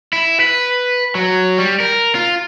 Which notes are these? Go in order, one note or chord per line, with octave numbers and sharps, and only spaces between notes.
E4
B4
F#3
G3
A#4
F4